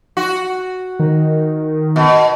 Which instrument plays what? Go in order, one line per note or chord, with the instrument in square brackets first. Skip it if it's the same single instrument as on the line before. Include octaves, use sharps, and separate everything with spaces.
[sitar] F#4
[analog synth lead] D#3
[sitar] B2